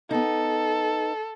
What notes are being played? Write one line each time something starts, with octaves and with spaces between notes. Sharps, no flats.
B3 D#4 A4